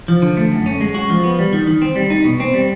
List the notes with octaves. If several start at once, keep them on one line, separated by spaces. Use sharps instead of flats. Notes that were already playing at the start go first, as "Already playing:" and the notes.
F3
D3
A3
F#2
C#4
G#3
F#4
F3
B3
G3
D#3
D#3
C4
G3
D#4
B2
C4
G3